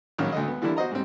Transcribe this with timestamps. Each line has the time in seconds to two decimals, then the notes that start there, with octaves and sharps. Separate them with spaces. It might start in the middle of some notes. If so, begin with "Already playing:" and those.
0.18 A#1 D#3 F#3 C#4 F6
0.32 D2 D3 D#5
0.48 B3
0.62 D3 E3 G3 A#3 D4 E4
0.77 F#4 C5 D#5 A#5
0.91 G#2 G3 C4